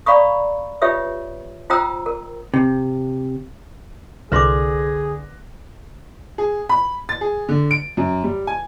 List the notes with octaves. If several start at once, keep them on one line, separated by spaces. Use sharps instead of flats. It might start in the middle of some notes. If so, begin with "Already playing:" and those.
D5 F5 A#5 B5 C#6 D#6
F4 G4 B4 C#5 E5 D#6
F4 C5 G5 A#5 D#6 E6
A#4
C3
C2 D3 G#4 B4 C6 D6 F#6 A#6
G#4
B5
A6
G#4
D3
D7
F#2
G3
G#5